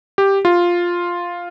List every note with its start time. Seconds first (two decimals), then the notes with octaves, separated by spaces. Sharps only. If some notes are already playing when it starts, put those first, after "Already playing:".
0.18 G4
0.45 F4